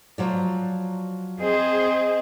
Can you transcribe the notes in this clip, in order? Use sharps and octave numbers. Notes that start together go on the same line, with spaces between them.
F3 F#3 D5
C4 G#4 D#5